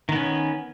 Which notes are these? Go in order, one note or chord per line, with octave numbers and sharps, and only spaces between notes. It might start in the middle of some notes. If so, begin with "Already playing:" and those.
D#3 B3 C#4